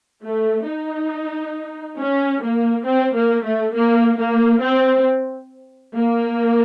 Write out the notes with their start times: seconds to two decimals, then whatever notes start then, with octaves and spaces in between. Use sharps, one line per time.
0.24 A3
0.68 D#4
1.98 C#4
2.43 A#3
2.87 C4
3.16 A#3
3.45 A3
3.74 A#3
4.18 A#3
4.62 C4
5.95 A#3